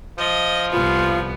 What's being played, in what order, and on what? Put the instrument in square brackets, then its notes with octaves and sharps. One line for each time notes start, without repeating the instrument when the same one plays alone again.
[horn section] F3 [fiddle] D#5
[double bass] C2 [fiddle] B3 [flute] F4